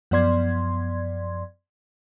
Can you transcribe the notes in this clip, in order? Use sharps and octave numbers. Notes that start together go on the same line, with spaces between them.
F#2 F3 B3 D5 C6 G#6